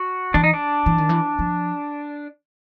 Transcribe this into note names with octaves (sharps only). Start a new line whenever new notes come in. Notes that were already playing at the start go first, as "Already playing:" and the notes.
Already playing: F#4
E3 D4
D#4
D4
E3
D#3
E3
F3